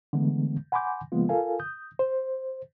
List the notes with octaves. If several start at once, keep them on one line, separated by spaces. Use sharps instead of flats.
D3 E3 G#3 A3 B3
F#5 G#5 B5 C6 D6 G6
C#3 F3 G#3 A#3 B3 F4
F4 A4 A#4 F5 G#5
D#6 G6
C5